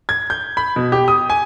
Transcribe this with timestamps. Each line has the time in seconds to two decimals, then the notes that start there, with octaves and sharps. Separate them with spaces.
0.09 G#6
0.30 G6
0.57 B5
0.76 B2
0.92 G4
1.08 D#6
1.30 G#5